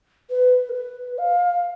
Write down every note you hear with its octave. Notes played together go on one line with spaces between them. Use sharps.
B4
A#4
B4
F5